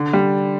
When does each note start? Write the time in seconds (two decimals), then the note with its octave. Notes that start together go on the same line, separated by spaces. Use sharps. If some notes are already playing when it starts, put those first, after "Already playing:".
Already playing: D3
0.13 G3